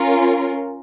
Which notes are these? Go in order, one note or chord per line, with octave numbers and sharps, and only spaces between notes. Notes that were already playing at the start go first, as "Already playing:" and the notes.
Already playing: C#4 F4 A#4